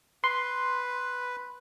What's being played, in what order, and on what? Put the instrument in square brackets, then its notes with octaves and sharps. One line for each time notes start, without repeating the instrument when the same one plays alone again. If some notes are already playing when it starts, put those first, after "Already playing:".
[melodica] B4 [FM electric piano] C6